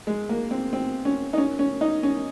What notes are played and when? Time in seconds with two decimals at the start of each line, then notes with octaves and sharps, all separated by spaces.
0.07 G#3
0.29 A#3
0.51 C4
0.73 C4
1.05 C#4
1.33 D#4
1.38 C#4
1.59 C#4
1.81 D#4
2.03 C#4